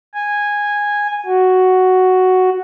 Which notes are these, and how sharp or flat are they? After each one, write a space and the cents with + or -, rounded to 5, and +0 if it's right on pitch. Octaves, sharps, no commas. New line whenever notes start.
G#5 -10
F#4 +5